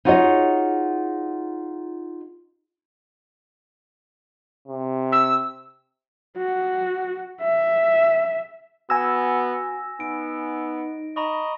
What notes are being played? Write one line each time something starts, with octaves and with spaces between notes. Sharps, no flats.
D#4 F4 F#4 G#4 C#5 D#5
C3
E6
F#4
E5
B3 F#4 G#5 E6 A#6
B3 D#4 D7
D#5 A#5 B5 C#6